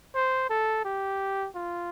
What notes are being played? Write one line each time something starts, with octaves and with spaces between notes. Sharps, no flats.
C5
A4
G4
F4